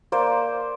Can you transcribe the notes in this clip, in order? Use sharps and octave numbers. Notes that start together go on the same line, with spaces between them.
A#3 C5 D5